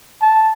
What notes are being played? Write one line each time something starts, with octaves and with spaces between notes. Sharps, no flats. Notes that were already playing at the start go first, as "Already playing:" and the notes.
A5